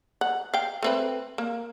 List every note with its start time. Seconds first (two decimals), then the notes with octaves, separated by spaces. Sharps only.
0.21 F#5
0.54 F5 G5
0.83 A3 C4 B4
1.38 A#3